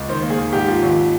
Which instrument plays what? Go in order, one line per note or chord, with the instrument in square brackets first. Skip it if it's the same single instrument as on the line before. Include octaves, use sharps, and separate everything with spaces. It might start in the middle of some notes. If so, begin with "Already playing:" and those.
Already playing: [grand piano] C#2
D#3 C5
A#3
G#4
D#2
G#2 G4
F3
G#1